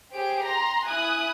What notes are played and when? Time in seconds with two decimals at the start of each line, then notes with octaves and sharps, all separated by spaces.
0.12 G4 G#4 C5 D7
0.44 A#5 C6 A#6
0.87 E4 G#5 D#6 F#6